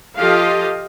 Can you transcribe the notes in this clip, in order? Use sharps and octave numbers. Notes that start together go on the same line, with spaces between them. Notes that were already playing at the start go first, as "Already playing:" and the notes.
F3 F4 G4 A4 D#5 F5